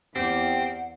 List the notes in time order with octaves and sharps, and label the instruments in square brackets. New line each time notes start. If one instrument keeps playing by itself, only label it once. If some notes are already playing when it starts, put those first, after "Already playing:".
[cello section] E2 [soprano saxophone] C4 [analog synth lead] G4 [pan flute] F#5